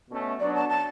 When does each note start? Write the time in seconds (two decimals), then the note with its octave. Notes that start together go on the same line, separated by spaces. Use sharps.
0.10 B2 A3 C#4
0.40 F#3 B3 D4 D5
0.55 A5
0.69 A5